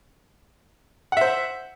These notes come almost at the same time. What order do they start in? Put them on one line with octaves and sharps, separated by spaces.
F#5 E5 C5